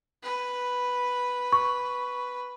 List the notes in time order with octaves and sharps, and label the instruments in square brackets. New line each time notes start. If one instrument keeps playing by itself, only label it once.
[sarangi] B4
[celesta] C#6